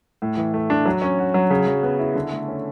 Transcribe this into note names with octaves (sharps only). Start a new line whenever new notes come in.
A2
E3
A3
D4
F#3
C#4
F#4
F#3
C#3
F#3
B3
E4
D3
A3
C#4